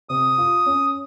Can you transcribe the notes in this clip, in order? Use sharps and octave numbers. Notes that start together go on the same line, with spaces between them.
C3 D#6
F4
C#4